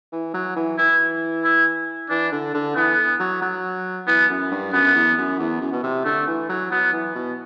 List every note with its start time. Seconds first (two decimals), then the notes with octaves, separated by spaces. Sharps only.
0.13 E3
0.34 F#3
0.56 E3
0.78 E3 E4
1.44 E4
2.10 E3 D4
2.32 D3
2.54 D3
2.76 E3 B3
3.20 F#3
3.42 F#3
4.07 E3 B3
4.30 F#2
4.51 G2
4.73 F#2 B3
4.95 E2
5.18 F#2
5.39 E2
5.61 F#2
5.73 B2
5.83 C3
6.05 D3 A3
6.27 E3
6.49 F#3
6.71 F#3 B3
6.93 E3
7.15 B2